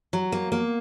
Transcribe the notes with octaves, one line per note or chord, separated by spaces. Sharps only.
F#3
A#3
A#3